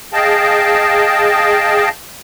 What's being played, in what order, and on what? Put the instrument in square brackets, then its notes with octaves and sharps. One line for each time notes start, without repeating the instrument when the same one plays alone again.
[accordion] G#4 D#5 F5 G5 A5